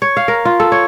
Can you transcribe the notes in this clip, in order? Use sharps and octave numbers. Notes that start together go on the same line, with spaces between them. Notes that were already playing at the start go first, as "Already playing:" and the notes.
C#5
F5
A#4
F4
A4
C#5